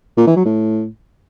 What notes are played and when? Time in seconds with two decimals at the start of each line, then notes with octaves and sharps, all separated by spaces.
0.17 A#2
0.27 E3
0.36 F#3
0.45 A2